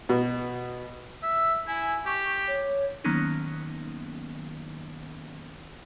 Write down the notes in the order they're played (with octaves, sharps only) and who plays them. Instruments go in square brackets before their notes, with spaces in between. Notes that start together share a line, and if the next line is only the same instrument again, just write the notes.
[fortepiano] B2
[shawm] E5
[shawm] E4 [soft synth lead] G#5
[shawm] G4 [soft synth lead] C#6
[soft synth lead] C#5
[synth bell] D#3 F#3 A#3 B3 C#4 D#4